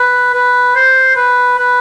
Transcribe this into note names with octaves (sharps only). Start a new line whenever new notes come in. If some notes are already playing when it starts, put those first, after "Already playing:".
Already playing: B4
B4
C5
B4
B4